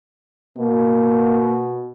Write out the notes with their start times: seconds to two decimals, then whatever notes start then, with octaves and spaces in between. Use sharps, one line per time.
0.57 B2 A#3